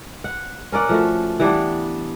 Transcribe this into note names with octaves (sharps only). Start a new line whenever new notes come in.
F#5
C#4 A#4 D5 F#5
F3 A3 F#4
E3 G3 B3 D4